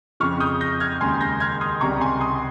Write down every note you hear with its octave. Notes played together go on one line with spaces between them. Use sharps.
F2 C#3 F3 C#6 F6
D#6 G6
G6 A#6
F6 G#6
D#2 C#3 G#3 G#5 C6
G6 A#6
F6 G#6
C6 D#6
C#2 C3 G3 A#5 C#6
G#5 C6
C6 D#6